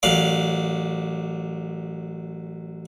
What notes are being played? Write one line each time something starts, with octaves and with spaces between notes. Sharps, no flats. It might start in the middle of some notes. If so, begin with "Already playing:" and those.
A1 F#2 D5 F5 D6